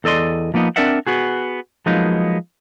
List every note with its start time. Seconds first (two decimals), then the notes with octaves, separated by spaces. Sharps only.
0.04 E2 A4 D5 D#5 C6
0.54 F3 A#3 B3 D#4
0.76 C4 D4 A#4 D5 E5 F#5
1.07 B3 F#4 G#4
1.86 F3 F#3 G#3 A#3 B3 D#4